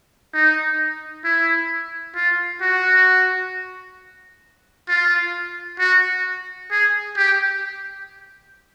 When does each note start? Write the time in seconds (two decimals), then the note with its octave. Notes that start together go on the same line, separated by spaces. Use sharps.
0.33 D#4
1.24 E4
2.15 F4
2.61 F#4
4.88 F4
5.79 F#4
6.71 G#4
7.17 G4